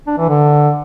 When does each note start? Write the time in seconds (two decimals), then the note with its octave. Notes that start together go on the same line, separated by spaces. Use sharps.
0.07 D4
0.18 E3
0.29 D3